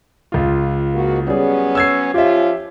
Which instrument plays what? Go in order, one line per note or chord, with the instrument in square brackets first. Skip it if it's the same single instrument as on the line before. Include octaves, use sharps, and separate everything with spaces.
[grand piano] C#2 F4
[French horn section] G#2 A#3 F#4
[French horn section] F#3 B3 C#4 [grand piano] G3 G#4
[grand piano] E6 G#6 C7
[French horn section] F3 C#4 F4 [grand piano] G4 E5